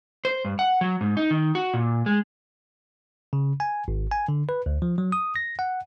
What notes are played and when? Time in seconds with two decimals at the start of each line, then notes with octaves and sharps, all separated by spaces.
0.25 C5
0.45 G2
0.59 F#5
0.81 F#3
1.01 G#2
1.17 D#4
1.31 D#3
1.55 F#4
1.74 A#2
2.06 G#3
3.33 C#3
3.60 G#5
3.88 G#1
4.11 G#5
4.28 D3
4.49 B4
4.66 D2
4.82 F3
4.98 F#3
5.12 D#6
5.36 A#6
5.59 F#5